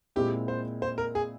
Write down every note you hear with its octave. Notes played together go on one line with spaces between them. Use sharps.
A#2 G#3 C4 E4 G4
C5
C5
A#4
G#4